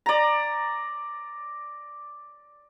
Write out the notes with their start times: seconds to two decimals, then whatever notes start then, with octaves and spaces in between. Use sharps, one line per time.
0.06 D5 A#5